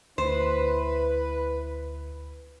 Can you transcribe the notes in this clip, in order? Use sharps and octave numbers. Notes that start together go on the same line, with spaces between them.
D2 E4 B4 C5